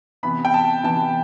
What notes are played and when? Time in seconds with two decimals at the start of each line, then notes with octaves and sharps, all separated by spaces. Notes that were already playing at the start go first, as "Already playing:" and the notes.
0.23 C3 E3 B3 B5
0.45 G5
0.54 A5
0.84 C3 E3 B3 A5